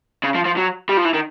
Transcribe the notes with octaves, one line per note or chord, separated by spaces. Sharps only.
C#3
F3
F3
F#3
G3
F3
E3
D#3